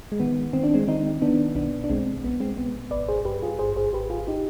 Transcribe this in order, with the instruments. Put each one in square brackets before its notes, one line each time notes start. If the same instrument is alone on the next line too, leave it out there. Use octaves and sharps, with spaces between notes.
[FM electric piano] G#3
D#3 B3
D#3 C4
D4
G#3 C4
D#3 C4 D#4
D#3 B3 D4
B1 B3 D4
D4
B1 G#3 C4
B1 B3
G#3 C4
B1 B3
G#1 B4 D5
G#4 C5
G2 G4 B4
F4 G#4
G#1 G#4 C5
G#4 C5
G#1 G4 B4
F4 G#4
D#4 G4